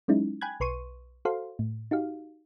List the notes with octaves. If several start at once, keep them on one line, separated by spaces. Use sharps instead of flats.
F#3 G#3 C#4 D#4 E4
G5 G#5 B5 F#6 G#6
B1 B4 C6 C#6 D#7
F#4 A4 C5 F5 C6
A2
D#4 F#4 G4 F5